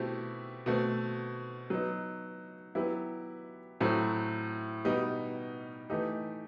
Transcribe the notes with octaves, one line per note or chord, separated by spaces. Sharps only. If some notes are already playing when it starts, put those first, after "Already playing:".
Already playing: B2 A3 C4 E4 G4
B2 A3 C4
F#3 B3 D#4
F#3 B3 E4 G4
A2 F#3 A3 C4
B2 G3 B3 D#4
E3 A3 D#4 G4